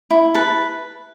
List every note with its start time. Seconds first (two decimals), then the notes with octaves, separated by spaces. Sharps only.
0.11 E4
0.34 B4 A5